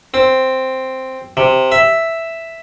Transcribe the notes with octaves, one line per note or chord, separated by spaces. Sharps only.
C4
C3
E5